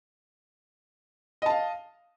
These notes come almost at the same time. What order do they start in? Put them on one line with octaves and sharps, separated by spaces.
D#5 A5 F5